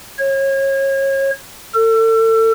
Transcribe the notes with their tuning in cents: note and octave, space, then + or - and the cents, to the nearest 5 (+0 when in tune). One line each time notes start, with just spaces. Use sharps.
C#5 -30
A4 +35